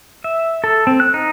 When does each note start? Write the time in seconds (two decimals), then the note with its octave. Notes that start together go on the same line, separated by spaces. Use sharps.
0.24 E5
0.64 A4
0.87 C4
1.00 F#6
1.14 D#4